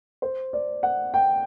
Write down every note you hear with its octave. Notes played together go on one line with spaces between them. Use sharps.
C5
D5
F#5
G5